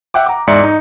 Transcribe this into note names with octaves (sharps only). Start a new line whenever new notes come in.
E5 F#5 G5 D6
A#5 D6
E2 G#2 D5 E5 C#7
D#4